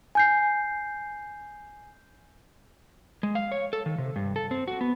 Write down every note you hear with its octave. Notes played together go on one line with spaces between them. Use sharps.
G#5 G6 C7
G#3
F5
C#5
A4
D#3
C3
G2
A4
C4
F#4
B3